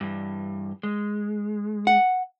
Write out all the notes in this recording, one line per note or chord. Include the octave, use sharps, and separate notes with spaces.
G2 E3
G#3
F#5